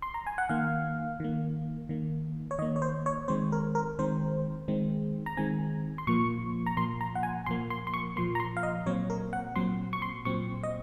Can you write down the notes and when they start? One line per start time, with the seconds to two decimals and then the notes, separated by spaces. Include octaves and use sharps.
0.02 C6
0.14 A#5
0.27 G#5
0.38 F#5
0.49 D#3 A#3 F5
1.20 D#3 A#3
1.89 D#3 A#3
2.51 C#5
2.59 D#3 D#5
2.62 A#3
2.76 C#5
2.82 C5
3.06 C#5
3.28 D#3 G#3 C4 C5
3.52 A#4
3.75 A#4
3.99 D#3 G#3 C4 C5
4.68 D#3 G#3 C4
5.26 A#5
5.37 D#3 G#3 C4 G#5
5.98 C6
6.07 A#2 F3 A#3 C#6
6.66 A#5
6.77 A#2 F3 A#3 C6
7.01 A#5
7.15 F#5
7.23 G#5
7.46 A#2 F3 A#3 C6
7.70 C6
7.87 C6
7.94 C#6
8.16 A#2 F3 A#3 C6
8.35 A#5
8.40 C6
8.57 F5
8.63 D#5
8.86 A#2 F#3 C4 C#5
9.10 A#4
9.33 F#5
9.56 A#2 F#3 C4 C6
9.93 C#6
10.02 C6
10.25 A#2 F#3 C4 C#6
10.63 D#5